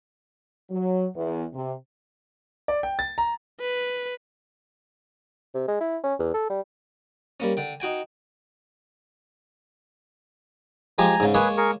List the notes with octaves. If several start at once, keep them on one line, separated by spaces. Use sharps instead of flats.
F#3
E2
C3
D5
G5
A6
A#5
B4
C3
G#3
E4
C#4
E2
A4
G3
G3 A#3 C#4
D3 G5
D#4 F#4 G5 G#5
F3 G#3 G4 G#5 A#5
G#2 C#3
G#3 A#3 G#4 B4 C#5
G#4 A#4 C#6